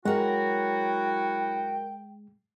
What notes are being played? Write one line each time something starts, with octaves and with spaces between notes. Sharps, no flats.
F#3 G#3 E4 F#4 A#4 F#5 G5